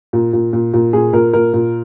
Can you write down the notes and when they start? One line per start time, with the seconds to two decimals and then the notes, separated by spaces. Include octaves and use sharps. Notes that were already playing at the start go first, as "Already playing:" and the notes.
0.13 A#2
0.33 A#2
0.53 A#2
0.74 A#2
0.93 A#2 G#4
1.13 A#2 A#4
1.33 A#2 A#4
1.53 A#2